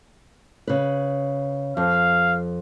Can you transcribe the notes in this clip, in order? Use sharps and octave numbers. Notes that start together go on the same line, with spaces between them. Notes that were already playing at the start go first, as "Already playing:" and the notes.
C#3 B4
F2 F5